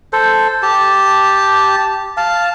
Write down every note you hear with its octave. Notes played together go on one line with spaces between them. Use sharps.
A4 C5
G4 A5
F5 A5